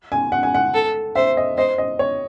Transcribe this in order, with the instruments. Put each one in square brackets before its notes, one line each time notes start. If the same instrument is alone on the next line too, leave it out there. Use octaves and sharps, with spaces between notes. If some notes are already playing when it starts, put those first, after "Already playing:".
[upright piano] G#5
F#5
G#5
F#5
[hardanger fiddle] A4
[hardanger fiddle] C5 [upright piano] E5
[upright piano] D#5
[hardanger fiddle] C5 [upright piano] D#5
[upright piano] D#5
C#5